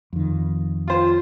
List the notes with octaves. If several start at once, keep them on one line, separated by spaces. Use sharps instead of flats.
F2 D#3
F4 C5